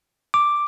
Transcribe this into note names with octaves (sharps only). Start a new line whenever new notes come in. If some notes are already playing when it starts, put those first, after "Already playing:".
D6